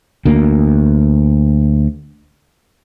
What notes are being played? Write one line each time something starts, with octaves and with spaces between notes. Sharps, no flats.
D2 A#3